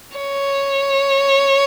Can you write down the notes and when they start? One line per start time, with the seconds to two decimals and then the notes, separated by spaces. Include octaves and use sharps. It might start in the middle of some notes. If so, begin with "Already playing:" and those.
0.17 C#5